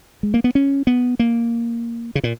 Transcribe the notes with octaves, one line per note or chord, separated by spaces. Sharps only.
G#3
A#3
B3
C#4
B3
A#3
C#3
A#2